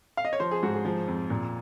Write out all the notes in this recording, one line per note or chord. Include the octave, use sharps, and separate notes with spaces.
F5
D#5
C#5
F3 C5
G#4
G#2 F#4
G#4
F3
F2
A#2